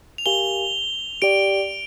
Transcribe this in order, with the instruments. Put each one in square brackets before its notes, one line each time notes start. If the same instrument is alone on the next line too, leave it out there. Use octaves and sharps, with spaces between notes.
[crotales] F7
[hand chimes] G4 A#4 F5 G#5 [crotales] G7
[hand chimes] G4 D5 G5 [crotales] D7